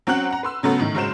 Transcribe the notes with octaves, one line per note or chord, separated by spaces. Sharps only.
F#3 C4 C#4 F#5 F#6 F#7
F#5 A#5
B4 C6 E6
C#3 F#3 A3 B3
A2 D#3
F#1 F#3 G#3 C5 E7